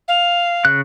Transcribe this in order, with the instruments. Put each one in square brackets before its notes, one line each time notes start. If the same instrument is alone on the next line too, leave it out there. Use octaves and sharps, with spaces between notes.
[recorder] F5
[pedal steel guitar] C#3 F#6